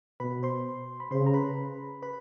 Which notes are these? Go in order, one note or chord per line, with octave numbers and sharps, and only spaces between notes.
B2 B4 B5
C5 C6
B5
C#3 C5 C6
A#5
B4 B5
B4 B5